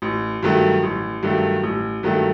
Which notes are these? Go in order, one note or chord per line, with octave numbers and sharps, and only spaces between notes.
A1
G2 D#3 F#3 A3
A1
G2 D#3 F#3 A3
A1
G2 D#3 F#3 A3